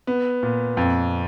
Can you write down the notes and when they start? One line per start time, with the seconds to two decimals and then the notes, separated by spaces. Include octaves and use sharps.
0.07 B3
0.43 A#2
0.77 F2